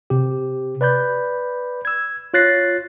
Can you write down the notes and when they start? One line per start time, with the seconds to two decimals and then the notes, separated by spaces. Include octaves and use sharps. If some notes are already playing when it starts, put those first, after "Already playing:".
0.10 C3 G4
0.81 B4 D5 B5 G6
1.85 E6 G#6
2.34 F4 C#5 F#6 A6 A#6 C7